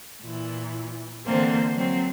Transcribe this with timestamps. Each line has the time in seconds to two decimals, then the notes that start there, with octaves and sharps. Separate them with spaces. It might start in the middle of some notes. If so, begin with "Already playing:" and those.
0.22 A#2 E3
1.26 D3 E3 A#3 C4 C5
1.75 F#3 C4